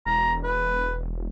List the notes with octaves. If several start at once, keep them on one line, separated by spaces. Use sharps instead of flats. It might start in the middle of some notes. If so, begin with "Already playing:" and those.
E1 A#5
B4